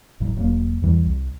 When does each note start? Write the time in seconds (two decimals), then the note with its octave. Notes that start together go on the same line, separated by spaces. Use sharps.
0.20 G1 A2 F#3
0.36 E1 F#3 A#3
0.82 E2 E3 G3
1.06 C2